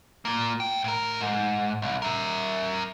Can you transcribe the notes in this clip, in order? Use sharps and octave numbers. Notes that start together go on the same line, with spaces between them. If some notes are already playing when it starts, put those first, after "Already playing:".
A#3 F4
G#2 G5
A2 A#4
G#2
C2
A#4 E5